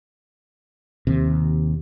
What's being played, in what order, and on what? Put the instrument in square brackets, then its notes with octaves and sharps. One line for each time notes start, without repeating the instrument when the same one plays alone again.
[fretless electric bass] D#2 C3